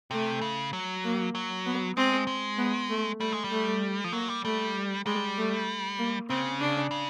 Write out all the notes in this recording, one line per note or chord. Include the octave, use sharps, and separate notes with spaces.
C3 A3
C#3
F#3
A#3
F#3
B3
G#3 C4
G#3
B3
A3
G3 A3
G#3
G3
A3
F3
F#3 A#3
G3
G3 A3
G3 G#3
A3
A#3
C#3 C4
D4
C#3